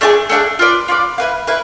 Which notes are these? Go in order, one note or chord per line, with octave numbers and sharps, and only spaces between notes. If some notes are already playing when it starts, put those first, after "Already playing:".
A3 D4 F4 G#4
A3 D4 F4 G#4
F4 B4 D5
F4 B4 D5
E4 B4 F5
E4 B4 F5